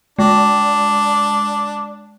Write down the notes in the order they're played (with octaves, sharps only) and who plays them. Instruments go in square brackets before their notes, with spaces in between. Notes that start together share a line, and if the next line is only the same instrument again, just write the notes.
[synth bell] G#3 [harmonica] D4